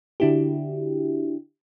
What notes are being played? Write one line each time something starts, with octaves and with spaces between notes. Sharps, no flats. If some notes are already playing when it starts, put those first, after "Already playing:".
D3 D4 E4 F#4 G4